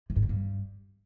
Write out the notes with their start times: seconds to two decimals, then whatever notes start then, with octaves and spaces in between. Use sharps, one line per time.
0.10 C3
0.16 G#2
0.23 B2
0.29 G2